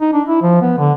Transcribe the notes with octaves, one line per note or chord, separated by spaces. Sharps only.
D#4
D4
E4
F3
B3
D3